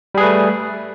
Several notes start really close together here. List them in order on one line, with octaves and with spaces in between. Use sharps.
G3 G#4 B4 A3